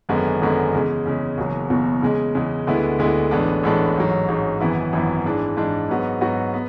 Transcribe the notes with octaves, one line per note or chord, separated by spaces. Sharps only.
G#1 F#2 D3 G#3 B3
G#1 F#2 D3 G#3 B3
E2 C#3 G#3
E2 C#3 G#3
F#1 E2 B2 F#3
F#1 E2 B2 F#3
E2 C#3 G#3
E2 C#3 G#3
D2 D3 G#3 B3 E4
D2 D3 G#3 B3 E4
A1 A2 G#3 B3 D4
A1 A2 G#3 B3 D4
A1 G#2 F#3
A1 G#2 F#3
G#1 F#2 E3 B3 E4
G#1 F#2 E3 B3 E4
G#2 E3 G#3 D4
G#2 E3 G#3 D4
G#2 F#3 B3 F#4
G#2 F#3 B3 F#4
B3